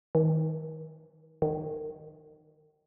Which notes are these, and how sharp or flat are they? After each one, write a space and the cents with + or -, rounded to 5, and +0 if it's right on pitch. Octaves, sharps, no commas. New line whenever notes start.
D#3 +30
D#3 -25